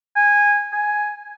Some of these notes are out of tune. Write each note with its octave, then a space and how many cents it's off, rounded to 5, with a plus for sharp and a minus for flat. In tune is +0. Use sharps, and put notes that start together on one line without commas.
G#5 -15
G#5 +5